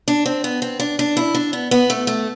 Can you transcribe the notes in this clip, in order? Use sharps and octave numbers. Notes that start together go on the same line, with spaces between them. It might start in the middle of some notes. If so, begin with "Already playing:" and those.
D4
C4
B3
C4
D4
D4
E4
D4
B3
B3
A3
A3